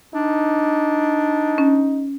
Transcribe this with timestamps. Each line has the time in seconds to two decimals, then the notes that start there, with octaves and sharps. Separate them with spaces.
0.14 D4 D#4
1.58 C#4